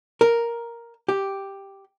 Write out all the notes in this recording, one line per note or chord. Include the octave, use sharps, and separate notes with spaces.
A#4
G4